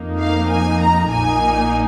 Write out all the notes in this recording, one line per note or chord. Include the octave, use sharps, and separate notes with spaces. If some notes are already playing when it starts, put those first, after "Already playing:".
Already playing: F2 F3 A#3 D#4
F5
G#5
A#5
A#1 A#2 A#3 D#4 G#5